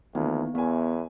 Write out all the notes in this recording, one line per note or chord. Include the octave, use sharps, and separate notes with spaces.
D2 D#3 E3 A#3 B3
E2 B3 E5 G#5